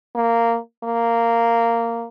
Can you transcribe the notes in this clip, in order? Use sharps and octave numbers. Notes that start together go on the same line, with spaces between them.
A#3
A#3